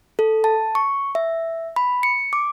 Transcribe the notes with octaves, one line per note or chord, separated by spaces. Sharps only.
A4
A5
C#6
E5
B5
C#7
D6